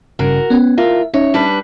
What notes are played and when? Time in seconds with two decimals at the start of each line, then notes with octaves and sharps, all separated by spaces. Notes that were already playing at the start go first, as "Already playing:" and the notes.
0.19 G#1 G2 C#3 F#4 A#4
0.50 B3 C#4
0.78 D2 F4 A#4 E5
1.14 C#4 D#4 C#5 E5
1.34 G3 D4 B4